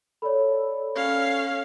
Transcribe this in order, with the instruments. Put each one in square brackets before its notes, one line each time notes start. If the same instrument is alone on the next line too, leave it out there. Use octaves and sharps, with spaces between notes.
[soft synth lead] A4 [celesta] C#5 D5 B5
[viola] C#4 F5 [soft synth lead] A4